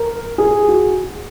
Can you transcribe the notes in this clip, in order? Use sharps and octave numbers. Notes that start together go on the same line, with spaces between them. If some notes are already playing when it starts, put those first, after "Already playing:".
Already playing: A#4
G#4
F#4